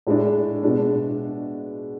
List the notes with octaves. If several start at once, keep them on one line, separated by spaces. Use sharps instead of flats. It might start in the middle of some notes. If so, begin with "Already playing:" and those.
A2 G#3 D4
B2 G#3 D4